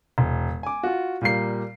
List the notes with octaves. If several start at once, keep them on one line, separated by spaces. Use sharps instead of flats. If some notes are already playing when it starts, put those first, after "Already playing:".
E1
G#5 D6
F4 F#4
A#2 G3 A#3 C7